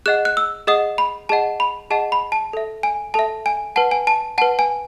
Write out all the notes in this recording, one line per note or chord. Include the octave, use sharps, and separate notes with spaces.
G#4 D#5 F#5 F#6
F#6
E6
G#4 D#5 F#5 D#6
B5
G#4 D#5 F#5 A5
B5
G#4 D#5 F#5 A5
B5
A5
A4 E5
G#5
A4 E5 A5
G#5
B4 F#5 A5
G#5
A5
B4 F#5 A5
G#5